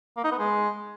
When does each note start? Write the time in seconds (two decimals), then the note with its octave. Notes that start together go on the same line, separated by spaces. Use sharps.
0.17 A#3
0.24 D#4
0.31 B3
0.39 G#3